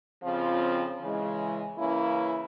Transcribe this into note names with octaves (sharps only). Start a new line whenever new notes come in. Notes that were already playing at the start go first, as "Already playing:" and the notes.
F2 C#3 F3 C4 F4
C#3 E3 G#3
C#3 E3 A#3 C#4 E4